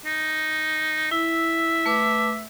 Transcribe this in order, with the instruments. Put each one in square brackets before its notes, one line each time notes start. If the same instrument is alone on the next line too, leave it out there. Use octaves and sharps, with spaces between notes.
[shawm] D#4
[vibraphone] E4 [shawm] E5
[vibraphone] A3 B4 D6